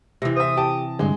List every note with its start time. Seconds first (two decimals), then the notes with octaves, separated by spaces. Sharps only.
0.22 C3 E3 A#6
0.36 C5 E5 D#6
0.57 G4 A5
0.99 G2 D3 G#3